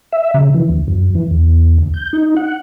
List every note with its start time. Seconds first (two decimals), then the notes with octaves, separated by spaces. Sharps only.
0.12 E5
0.34 C#3
0.54 E3
0.69 D2
0.88 F#2
1.15 E3
1.31 E2
1.78 D2
1.94 G6
2.13 D#4
2.36 F#5